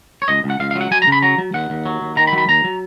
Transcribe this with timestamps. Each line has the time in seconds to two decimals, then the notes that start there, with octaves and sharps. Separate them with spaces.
0.22 C#5
0.28 C#2 D#5
0.44 C#2
0.50 F#5
0.60 C#2 F5
0.71 F5
0.76 F#3
0.81 F#5
0.91 F#3 G#5
1.02 A#5
1.07 C#3
1.12 B5
1.22 F#3 A#5
1.38 F#3
1.54 D#2 F#5
1.70 D#2
1.86 F#3
2.01 D#2
2.17 D#3 A#5
2.27 B5
2.33 F#3
2.38 B5
2.48 D#2 A#5
2.64 F#3